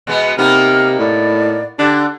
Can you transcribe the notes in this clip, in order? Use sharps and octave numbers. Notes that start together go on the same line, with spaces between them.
B2 G#3 B3
C3 A#3 B3 D#4 F6
A2 D5
D3 D4 G4